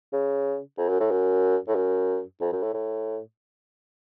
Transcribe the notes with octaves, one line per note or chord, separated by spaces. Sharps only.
C#3
F2
F#2
A2
F#2
A2
F#2
F2
F#2
A2
A2